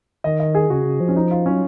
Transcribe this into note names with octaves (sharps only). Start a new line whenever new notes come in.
D#3 D#5
D#5
G#4
C#3 F#4
C#3
F3
C#4
D#4
F4
F#3 C#4